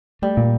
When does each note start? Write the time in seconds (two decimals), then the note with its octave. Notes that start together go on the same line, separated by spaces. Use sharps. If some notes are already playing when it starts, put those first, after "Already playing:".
0.22 G3 A3
0.37 A#2